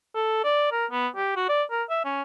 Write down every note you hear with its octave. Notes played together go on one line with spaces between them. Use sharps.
A4
D5
A#4
B3
G4
F#4
D5
A#4
E5
C#4